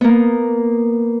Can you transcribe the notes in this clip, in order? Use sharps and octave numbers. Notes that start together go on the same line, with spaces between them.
A#3 B3